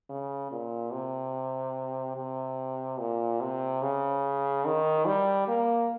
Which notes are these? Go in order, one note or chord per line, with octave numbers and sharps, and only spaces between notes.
C#3
A#2
C3
C3
A#2
C3
C#3
D#3
G3
A#3